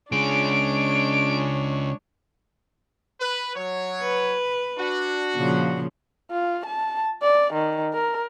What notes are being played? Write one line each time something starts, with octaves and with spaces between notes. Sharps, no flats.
C#3 G#3 D4 C#5 D7
B4
F#3 C#5
B4
D4 F#4
A#2 C#3 F3
F4
A5
D5
D#3
A#4